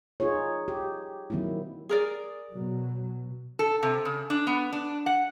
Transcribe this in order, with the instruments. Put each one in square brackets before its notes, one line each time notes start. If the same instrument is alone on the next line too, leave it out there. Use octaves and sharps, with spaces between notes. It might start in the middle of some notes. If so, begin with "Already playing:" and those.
[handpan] D#4 F4 G#4 C#5
G4
D#3 F#3 A#3 C4 E4
[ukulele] G#4 A#4 D5
[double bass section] B2 F#3
[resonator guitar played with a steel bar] A4
C3
C#3
D4
B3
D4
F#5